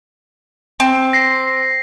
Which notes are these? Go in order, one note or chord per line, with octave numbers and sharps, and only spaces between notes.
C4
A#6 C7